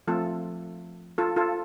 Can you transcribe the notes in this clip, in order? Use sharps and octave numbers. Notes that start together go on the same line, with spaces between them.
F3 A3 C4 F4 A4
F4 A4
F4 A4